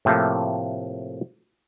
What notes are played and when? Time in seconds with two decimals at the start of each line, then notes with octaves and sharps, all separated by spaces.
0.05 A2 C3 F3 A3 A#3